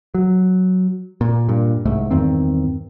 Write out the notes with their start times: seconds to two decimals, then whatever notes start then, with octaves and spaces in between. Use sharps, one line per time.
0.14 F#3
1.21 A#2
1.49 G2 A#2
1.85 C2 G#2 A3
2.11 E2 G2 D#3 C4